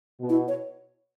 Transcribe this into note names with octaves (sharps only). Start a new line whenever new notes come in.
B2
E4
C#5